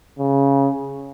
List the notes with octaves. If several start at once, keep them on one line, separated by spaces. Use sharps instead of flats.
C#3